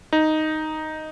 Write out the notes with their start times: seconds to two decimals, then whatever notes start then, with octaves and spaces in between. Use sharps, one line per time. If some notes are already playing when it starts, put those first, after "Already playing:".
0.13 D#4